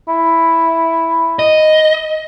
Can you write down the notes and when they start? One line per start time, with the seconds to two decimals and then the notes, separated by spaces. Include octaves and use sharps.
0.08 E4
1.39 D#5